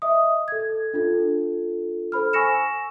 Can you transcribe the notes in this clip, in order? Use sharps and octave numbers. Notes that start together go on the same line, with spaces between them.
D#5 E5 D#6
A4 G#6
D4 F4 A4
A4 C5 B5 F6
G#5 C#6 E6 A#6 C#7 E7